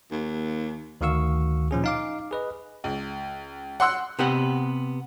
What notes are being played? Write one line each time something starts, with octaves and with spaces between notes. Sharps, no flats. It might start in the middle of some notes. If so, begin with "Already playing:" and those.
D#2
D2 D#3 F#4 F5 C#6 E6
A#2 F3 C#4 G#4
D#4 F5 D6
G#4 B4 D#5
C#2
F#5 C6 E6 F#6
C3 B3 G4 F#5